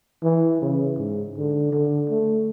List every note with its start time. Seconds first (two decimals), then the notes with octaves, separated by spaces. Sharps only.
0.23 E3
0.62 C#3
0.98 G#2
1.37 D3
1.72 D3
2.09 A3